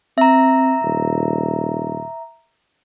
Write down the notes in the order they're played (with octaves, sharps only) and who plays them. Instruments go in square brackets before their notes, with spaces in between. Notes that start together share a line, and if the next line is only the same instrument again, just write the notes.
[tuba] C4 [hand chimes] E5 A#5
[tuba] D#1